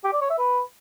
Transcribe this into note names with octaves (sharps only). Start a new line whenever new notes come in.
G4
D5
C#5
E5
B4